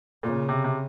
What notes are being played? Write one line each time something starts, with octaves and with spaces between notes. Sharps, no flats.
A#2 C#3
C3
C3